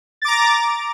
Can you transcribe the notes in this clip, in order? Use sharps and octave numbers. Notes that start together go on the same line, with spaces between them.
A#5 D6 A6